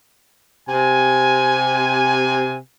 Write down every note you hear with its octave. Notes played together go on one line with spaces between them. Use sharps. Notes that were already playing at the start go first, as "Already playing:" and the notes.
C3 G#5